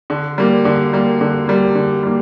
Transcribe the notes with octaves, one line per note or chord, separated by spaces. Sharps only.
D3
G3 A#3
D3
G3 A#3
D3
G3 A#3
D3
G3 A#3